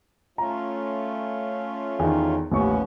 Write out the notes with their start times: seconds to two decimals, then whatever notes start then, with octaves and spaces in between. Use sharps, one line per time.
0.38 A3 C#4 F4 A#5
1.99 E2 D#3
2.52 A1 D#2 F3 B3 C#4 C#6